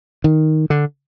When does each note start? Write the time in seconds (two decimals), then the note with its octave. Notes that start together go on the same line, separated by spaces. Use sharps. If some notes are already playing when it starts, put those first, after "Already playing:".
0.24 D#3
0.70 D3